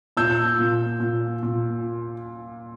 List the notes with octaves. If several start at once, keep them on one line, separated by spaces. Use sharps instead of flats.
A#2 E6 G6
A#2
A#2
A#2